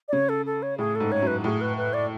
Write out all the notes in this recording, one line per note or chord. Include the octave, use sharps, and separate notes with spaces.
D5
C#3 C#5
A4
A4
C#5
A2 G#4
A4
G#2
C#5
F#2
B4
F#4
A2 G#4
B4
B4
D5